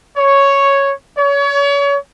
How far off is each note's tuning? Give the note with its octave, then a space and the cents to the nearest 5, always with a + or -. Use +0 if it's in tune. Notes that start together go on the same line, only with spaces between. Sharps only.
C#5 +0
C#5 +35